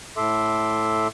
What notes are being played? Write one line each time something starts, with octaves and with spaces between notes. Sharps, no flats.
A2 A4 E5 C6 D6